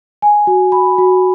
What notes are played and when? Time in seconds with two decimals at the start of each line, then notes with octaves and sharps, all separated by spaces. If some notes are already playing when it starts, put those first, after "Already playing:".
0.22 G#5
0.47 F#4
0.72 B5
0.98 F#4